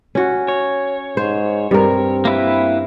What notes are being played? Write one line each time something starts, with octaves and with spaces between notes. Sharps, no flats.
C#4 F#4
C#5
G#2 C5
G2 C4 A#4
A#3 E4 B4